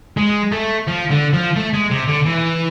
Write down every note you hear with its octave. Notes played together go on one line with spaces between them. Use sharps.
G#3
A3
F3
D3
F3
A3
G#3
C3
D3
E3